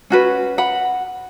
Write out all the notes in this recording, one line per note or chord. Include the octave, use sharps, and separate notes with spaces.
C#4 F#4 B4
F#5 B5